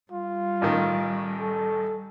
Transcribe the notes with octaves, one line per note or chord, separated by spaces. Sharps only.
G3 F4
A1 A2 D#3
A4